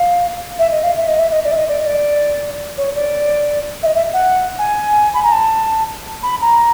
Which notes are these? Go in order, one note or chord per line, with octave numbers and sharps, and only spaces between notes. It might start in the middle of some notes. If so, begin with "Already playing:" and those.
Already playing: F5
E5
D#5
F5
E5
D#5
E5
D#5
D5
E5
D#5
D5
D#5
D5
C#5
D5
E5
D#5
E5
F#5
G#5
B5
A#5
A5
B5
A#5